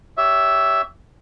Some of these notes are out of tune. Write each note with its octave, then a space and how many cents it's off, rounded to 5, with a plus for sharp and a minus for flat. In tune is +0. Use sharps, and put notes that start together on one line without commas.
G4 +0 C#5 +25 E5 +0